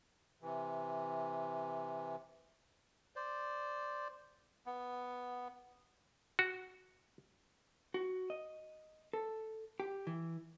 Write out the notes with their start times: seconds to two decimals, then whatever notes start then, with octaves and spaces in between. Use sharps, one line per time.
0.42 C3 E3
3.16 C5 D5
4.66 B3
6.39 F#4
7.94 F#4
8.30 D#5
9.13 A4
9.80 G4
10.07 E3